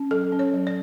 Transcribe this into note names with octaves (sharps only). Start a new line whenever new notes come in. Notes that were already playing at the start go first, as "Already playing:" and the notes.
Already playing: C#4
F#3 A4
C#4
C#5
F#3
D5